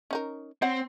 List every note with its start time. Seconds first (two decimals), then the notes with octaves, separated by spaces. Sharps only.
0.11 C#4 D#4 A#4
0.62 C4 C5 C#5 F#5